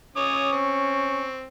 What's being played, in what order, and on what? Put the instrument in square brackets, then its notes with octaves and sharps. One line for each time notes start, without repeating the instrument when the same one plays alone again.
[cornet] C#4 [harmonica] C#5 D6 D#6
[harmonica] C4 [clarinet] C#6